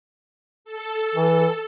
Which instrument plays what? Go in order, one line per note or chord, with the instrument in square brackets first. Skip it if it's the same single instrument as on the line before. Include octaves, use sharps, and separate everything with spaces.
[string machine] A4
[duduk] E3